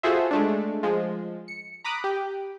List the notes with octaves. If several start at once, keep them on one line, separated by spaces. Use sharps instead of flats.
F4 F#4 G#4 A4 C5 E5
G#3 A3 D4
F3 G#3
C#7
A#5 B5 D6 D#6 F#6
G4